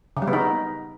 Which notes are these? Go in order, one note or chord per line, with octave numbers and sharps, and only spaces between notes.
C#3
G3
B3
D#4